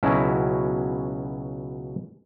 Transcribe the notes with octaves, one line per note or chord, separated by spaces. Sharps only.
C#2 B2 F#3 C#4 E4